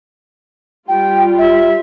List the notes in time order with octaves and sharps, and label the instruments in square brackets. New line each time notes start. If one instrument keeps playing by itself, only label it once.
[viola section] G3 F4 [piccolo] G5
[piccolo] E5